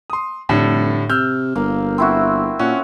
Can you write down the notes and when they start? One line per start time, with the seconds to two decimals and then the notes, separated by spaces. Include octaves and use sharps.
0.10 C6 D#6
0.49 F1 A2 D3 G3
1.09 C3 E6 F6 G6
1.55 G1 A#3 F5
1.98 C4 E4 F#4
2.59 A#2 C#4 F#4